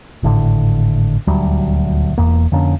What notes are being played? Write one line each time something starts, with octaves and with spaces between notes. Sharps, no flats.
G#1 A2 D3
D#1 D2 F#3 G3
E1 E2 A#3
F2 D3 A#3 C#4